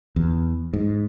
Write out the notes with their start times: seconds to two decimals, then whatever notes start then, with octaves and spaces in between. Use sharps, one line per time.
0.16 E2
0.73 G#2